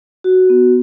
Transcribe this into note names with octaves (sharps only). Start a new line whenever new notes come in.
F#4
B3